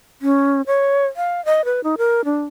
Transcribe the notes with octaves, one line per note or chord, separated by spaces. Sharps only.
C#4
C#5
F5
D#5
B4
D#4
A#4
D4